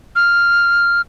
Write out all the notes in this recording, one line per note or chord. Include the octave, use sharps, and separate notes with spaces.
F6